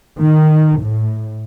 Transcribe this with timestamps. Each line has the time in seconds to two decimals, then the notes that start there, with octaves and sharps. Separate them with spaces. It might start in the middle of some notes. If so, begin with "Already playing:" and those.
0.20 D#3
0.81 A2